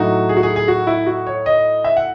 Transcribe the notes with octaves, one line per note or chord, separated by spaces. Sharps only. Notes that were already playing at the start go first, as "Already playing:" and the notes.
Already playing: A2 F#3 A3 D#4 F#4
G#4
F#4
G#4
G#4
F#4
E4
F#4
C#5
D#5
E5
F#5